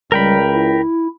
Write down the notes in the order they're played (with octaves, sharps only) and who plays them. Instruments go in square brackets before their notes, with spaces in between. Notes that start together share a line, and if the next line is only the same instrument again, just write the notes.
[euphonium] C#2 [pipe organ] G3 [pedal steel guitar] A#4 G5 B5
[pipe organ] E4